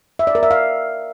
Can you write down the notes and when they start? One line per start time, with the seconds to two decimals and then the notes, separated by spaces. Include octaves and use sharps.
0.19 E5
0.27 D5
0.35 A#4
0.43 E5
0.51 F5